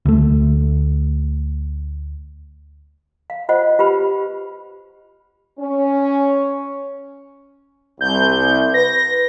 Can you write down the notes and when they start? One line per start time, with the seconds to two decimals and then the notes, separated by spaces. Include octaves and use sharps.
0.05 D2 A3
3.30 F5
3.49 F4 C5 D#5 F#5
3.79 F4 G4 B4 B5
5.59 C#4
8.01 C2 G6
8.74 B4 A#6